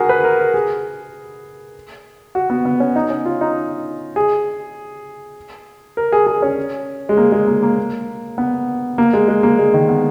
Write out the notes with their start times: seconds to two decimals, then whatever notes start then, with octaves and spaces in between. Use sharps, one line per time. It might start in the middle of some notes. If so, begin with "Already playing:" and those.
Already playing: F#4 G#4 A#4
0.09 B4
0.24 A#4
0.39 A#4
0.54 G#4
2.35 F#4
2.50 B3
2.65 B3
2.80 C#4
2.96 D#4
3.10 C#4
3.25 F4
3.41 D#4
4.16 G#4
5.97 A#4
6.12 G#4
6.27 G#4
6.42 C#4
7.09 G#3
7.17 A#3
7.32 G#3
7.47 A#3
7.63 A#3
8.38 B3
8.98 A#3
9.13 G#3
9.28 G#3
9.43 A#3
9.59 G#3
9.74 D#3
9.89 B3